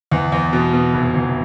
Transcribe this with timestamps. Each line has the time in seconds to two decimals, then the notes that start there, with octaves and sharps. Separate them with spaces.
0.12 E2
0.32 E2
0.53 B2
0.73 B2
0.94 F1
1.15 E2